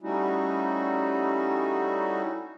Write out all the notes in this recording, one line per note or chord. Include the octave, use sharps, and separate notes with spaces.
G3 A3 C#4 D#4 E4 F#4